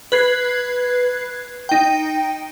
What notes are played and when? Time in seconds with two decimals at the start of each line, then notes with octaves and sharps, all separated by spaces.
0.12 B4 F#6 G#6 C7
1.69 D#4 G5